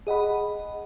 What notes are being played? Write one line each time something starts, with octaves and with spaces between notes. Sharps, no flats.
G#4 D#5 F#5 B5